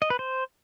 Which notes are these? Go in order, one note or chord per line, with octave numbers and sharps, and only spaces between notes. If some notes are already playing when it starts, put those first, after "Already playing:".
D#5
B4
C5